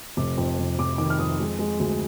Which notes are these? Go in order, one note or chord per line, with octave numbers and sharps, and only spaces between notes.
F1 D6
F2
F1
F1 D6
D#3 D6
F6
F2 D#6
G#3
G#3
D2